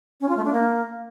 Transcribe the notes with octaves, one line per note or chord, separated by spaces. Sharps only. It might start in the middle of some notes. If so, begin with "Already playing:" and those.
C#4
F4
A3
D4
A#3